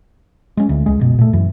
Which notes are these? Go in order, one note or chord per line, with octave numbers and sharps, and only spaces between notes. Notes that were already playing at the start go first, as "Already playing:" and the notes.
G#3 C#4
D2
C#2 G#3
F#1 B2
A#2 A3
F#2 E3